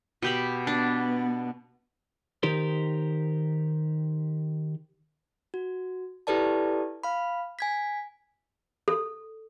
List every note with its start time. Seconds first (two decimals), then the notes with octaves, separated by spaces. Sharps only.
0.22 B2 G4 B5
0.67 B3 D4
2.43 D#3 D#4 G4 A#4 C5
5.54 F#4
6.27 E4 G4 A4 B4 D5 A5
7.03 F5 B5
7.59 G#5 G#6 B6
8.88 A4